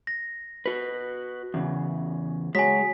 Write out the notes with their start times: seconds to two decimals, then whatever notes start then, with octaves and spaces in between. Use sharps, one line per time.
0.07 A#6
0.66 F#4 B4
1.54 E2 C#3
2.55 F#3 G#3 G#5 B6